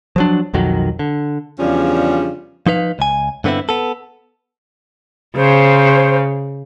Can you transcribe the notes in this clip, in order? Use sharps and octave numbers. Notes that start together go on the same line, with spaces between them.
F3 F#3 D4
B1 F2 D#3 F#3
D3
E2 C#3 F3 G3 C#4 D4
F3 D#4 B4 F5
C#2 G#5
G2 D3 B3 C4 E4
B3 A4
C#3 C5